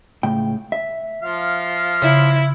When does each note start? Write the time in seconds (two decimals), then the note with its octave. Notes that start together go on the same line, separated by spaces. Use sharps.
0.23 C#2 A2 G5
0.72 E5
1.23 F3 F5
2.02 C#3 E4